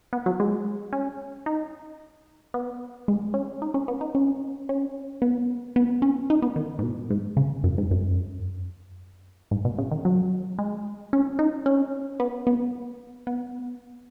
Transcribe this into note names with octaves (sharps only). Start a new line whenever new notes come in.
B3
F#3
G#3
C#4
D#4
B3
G#3
C#4
D#4
C#4
B3
D#4
C#4
C#4
B3
B3
C#4
D#4
B3
D#3
G#2
B2
G#2
C#3
F#2
G#2
F#2
G#2
B2
C#3
D#3
F#3
G#3
C#4
D#4
C#4
B3
B3
B3